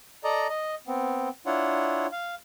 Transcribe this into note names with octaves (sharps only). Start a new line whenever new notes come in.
A4 D5 D#5 A#5
D#5
B3 C4
D4 E4 F4 C#5 F#5
F5